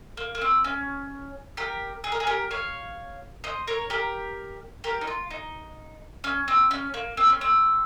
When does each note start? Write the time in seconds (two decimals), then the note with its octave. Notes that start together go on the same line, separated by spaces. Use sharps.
0.17 A#3
0.35 A#3
0.41 C4
0.64 C#4
1.57 G4 A#4
2.04 G#4
2.12 A#4
2.20 G#4
2.27 G4 A#4
2.51 C#5 F5
3.44 C5 D#5
3.67 A#4 C#5
3.90 G4 A#4
4.84 G4 A#4
5.01 D#4
5.07 F4
5.30 D#4
6.24 C#4
6.48 C4
6.71 C#4
6.94 A#3
7.17 C4
7.30 C#4
7.41 C4